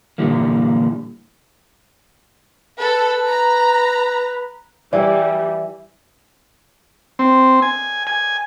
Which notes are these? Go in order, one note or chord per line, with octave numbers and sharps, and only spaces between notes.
A#2 D3 E3 G3 A#3
A4 B4
A#5
E3 G3 E4 D5
C4
G#5
G#5